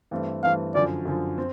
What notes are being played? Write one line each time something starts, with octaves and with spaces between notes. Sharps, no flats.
G2 E3 A3 C4
G2 E3 A3 C4 F5
F#2 D3 F3 D5
F#2 D3 F3
C4